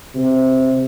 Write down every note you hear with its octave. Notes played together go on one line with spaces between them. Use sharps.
C3